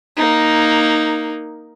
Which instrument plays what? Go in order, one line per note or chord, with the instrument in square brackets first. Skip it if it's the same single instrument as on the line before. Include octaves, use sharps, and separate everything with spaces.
[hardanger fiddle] A#3 D#4